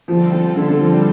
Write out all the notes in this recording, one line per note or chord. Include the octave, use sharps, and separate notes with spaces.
D3 F3 G3 C4 F4 A4
F3
D3
D3
F3
G3